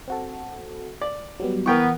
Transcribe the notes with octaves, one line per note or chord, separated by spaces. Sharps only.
C4 F#4 A4
D5
F#3 G3 B3
E3 B3 A#4 G5 C#6